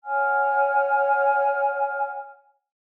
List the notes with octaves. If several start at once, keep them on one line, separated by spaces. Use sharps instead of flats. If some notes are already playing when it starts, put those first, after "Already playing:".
C#5 F#5 G#5 F6